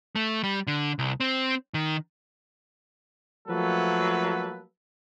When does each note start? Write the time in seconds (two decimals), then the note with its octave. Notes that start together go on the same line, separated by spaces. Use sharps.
0.16 A3
0.44 G3
0.67 D3
0.99 C2
1.20 C4
1.74 D#3
3.49 F3 F#3 A3 A#3 A4 B4